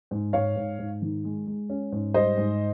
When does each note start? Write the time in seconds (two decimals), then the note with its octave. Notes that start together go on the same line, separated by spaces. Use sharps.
0.11 G#2
0.33 G#2 C#5 F5
0.56 G#2
0.79 G#2
1.02 D#3
1.24 G#3
1.47 G#3
1.70 C#4
1.92 G#2
2.14 G3 C5 D#5
2.37 G#2